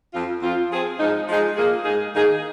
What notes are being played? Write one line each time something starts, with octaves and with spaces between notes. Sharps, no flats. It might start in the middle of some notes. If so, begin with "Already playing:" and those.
F2 F3 C4 F4
F2 F3 C4 F4
F3 C4 G#4
G#2 F3 G#3 D#4
F3 G#3 D#4 G#4
A#2 A#3 G#4
G#2 G#3 D#4 G#4
D#3 A#3 D#4 G#4